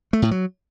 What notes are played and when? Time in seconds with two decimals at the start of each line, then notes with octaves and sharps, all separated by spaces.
0.13 A3
0.22 A2
0.31 F#3